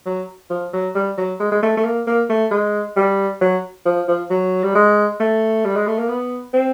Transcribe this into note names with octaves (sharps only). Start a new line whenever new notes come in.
F#3
F3
F#3
G3
F#3
G#3
G#3
A3
A3
A#3
A#3
A3
G#3
G3
F#3
F3
F3
F#3
G3
G#3
A3
G3
G#3
A3
A#3
B3
C4